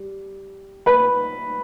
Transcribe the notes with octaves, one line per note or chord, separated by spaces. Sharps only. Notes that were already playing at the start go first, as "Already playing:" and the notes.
Already playing: G3
B4 B5